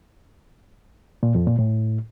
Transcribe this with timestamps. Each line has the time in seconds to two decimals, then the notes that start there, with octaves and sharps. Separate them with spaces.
1.23 A#2
1.35 F2
1.47 A#2
1.59 A2